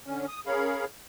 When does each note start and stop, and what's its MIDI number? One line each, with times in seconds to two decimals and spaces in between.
0.06 0.26 50
0.06 0.26 61
0.28 0.40 87
0.47 0.85 61
0.47 0.85 68
0.47 0.85 70
0.47 0.85 73
0.47 0.85 77
0.47 0.85 83